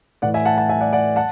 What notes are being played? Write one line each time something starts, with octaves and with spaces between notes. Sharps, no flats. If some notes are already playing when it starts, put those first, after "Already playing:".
A2 E3 D5 F#5
E5 G#5
F#5 A5
F#5 A5
E5 G#5
D5 F#5
D5 F#5
F#5 A5